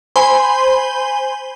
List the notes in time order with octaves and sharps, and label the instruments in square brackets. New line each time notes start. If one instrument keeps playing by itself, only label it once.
[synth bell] C5 G#5 B5 C6